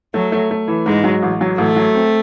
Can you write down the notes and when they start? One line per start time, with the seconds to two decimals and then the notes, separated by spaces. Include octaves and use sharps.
0.14 F#3 A3
0.32 A3
0.51 A3
0.68 E3
0.86 G#2 G#3
1.04 F#3
1.23 A1
1.41 F#3
1.58 A1 A3
1.76 F#3
1.95 C4